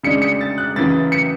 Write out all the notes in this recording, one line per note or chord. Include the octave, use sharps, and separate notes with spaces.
C#3 G#3 D4 C#7
C#7
A6
F#6
F#2 C#3 E3 A6
C#7